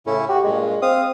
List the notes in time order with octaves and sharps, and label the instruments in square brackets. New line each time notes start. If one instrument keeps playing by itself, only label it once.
[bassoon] A2 [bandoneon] C#3 C#4 E4
[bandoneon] F#4 [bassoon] G4
[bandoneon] G2 A#2 [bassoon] G#3
[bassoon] C4 [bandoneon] F5 D#6